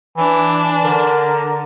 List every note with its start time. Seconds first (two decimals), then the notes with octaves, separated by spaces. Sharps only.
0.17 E3 D4
0.84 D3 A#4